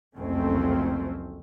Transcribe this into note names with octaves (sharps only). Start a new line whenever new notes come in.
F#1 C2 F2 A3 C4 C#4